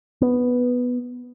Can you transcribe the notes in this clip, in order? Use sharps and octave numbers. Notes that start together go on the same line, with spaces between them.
B3